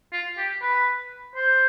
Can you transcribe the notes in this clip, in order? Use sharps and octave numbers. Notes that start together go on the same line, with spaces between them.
F4
G4
B4
C5